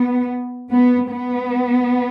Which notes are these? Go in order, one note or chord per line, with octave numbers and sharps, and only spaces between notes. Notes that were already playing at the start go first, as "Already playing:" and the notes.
Already playing: B3
B3
B3